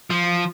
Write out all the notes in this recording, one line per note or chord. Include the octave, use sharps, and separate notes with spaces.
F3